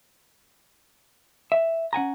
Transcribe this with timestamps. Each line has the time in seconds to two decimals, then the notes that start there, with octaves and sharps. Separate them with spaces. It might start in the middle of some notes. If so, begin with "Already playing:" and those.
1.52 E5
1.93 C#4 F#5 G#5 A#5